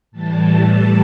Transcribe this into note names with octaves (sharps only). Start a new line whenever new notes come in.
A2 E3 G3 A5